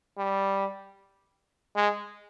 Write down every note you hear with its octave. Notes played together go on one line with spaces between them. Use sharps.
G3
G#3